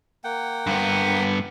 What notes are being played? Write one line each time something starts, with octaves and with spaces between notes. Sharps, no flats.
A#3 F#5 G5
G2 B3